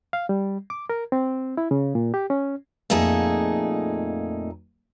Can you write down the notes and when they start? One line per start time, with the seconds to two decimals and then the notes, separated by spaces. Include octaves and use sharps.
0.13 F5
0.29 G3
0.70 D6
0.90 A#4
1.12 C4
1.57 E4
1.71 C#3
1.95 A#2
2.14 G4
2.30 C#4
2.90 F2 A#2 A3 D#4 G#4 A5